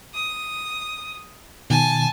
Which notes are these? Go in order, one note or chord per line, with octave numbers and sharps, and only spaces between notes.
D#6
B2 D#3 G#5 A5